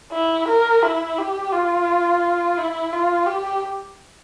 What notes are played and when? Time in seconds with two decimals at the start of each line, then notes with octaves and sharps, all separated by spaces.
0.13 E4
0.48 A#4
0.82 E4
1.18 G4
1.52 F4
2.58 E4
2.93 F4
3.27 G4